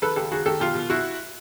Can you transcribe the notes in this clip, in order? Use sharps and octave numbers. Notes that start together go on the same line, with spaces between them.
D#3 A4 B4
C#2 G4 A4
D#3 F#4 G#4
D#3 G4 A4
B2 F4 G4
B2
B2 E4 F#4